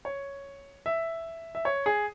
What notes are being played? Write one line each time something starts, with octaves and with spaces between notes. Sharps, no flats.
C#5
E5
E5
C#5
G#4